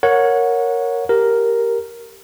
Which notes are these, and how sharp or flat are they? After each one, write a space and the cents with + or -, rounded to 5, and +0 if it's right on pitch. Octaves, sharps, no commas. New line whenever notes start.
A#4 +0 C#5 +0 F#5 -20
G4 +0 A#4 +0